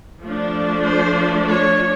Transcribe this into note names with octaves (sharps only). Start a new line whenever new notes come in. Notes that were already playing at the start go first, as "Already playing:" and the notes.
F3 A3 D4
C5
C#5